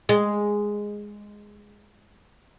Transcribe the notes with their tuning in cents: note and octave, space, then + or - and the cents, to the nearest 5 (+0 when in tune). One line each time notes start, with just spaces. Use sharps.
G#3 -5